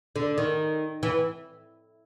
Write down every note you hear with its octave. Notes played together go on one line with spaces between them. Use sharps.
D3
D#3
E3